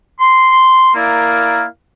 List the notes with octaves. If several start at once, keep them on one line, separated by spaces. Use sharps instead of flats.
C6
A#3 E4 A#4 D5 F5